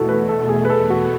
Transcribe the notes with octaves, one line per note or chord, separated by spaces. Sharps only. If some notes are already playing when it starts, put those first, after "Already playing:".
Already playing: E2 B2 A3 E4 F#4 A4
B4
A4
G#4
B4
A4
F#4